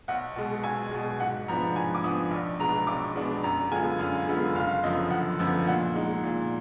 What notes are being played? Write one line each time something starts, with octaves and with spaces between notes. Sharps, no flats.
B1 F#5
B2 G#3
B1 G#5
B2 G#3
G#2 F#5
F3 B3 D4 A#5
G#2 G#5
D6
F3 B3 D4 D#6
B1
B2 G#3 B3 D4 A#5
B1 D6
B2 G#3 B3 D4
F#2 A#5
D3 G#3 B3 F4 G#5
F#2 F5
D3 G#3 B3 F4
F#1 F5
F#2 D3 F3 B3 D#5
F#1 F#5
F#2 D3 F3 B3
A#2 F#5
G#3 D#4
A#2